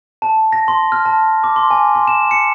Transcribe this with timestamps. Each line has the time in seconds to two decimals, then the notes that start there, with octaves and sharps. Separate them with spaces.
0.22 A5
0.52 A#6
0.68 C6
0.92 F6
1.05 A5
1.44 D6
1.56 C6
1.71 G#5
1.95 C6
2.08 E7
2.31 C#7